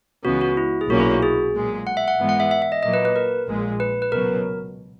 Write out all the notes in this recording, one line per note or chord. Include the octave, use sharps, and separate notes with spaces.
C#2 C#3 E3 G#3 B3 F#4
F#4
E4
G#4
B1 A#2 A#3 C#4 F#4
E4
F#4
G#4
B1 A#2 G#3
F#5
E5
F#5
G#2 E3 G#3 B3
F#5
E5
E5
E5
D#5
A#2 F#3 A#3 D#5
B4
B4
A#4
A#1 A#2 G#3
B4
B4
C#2 B2 F#3 A#4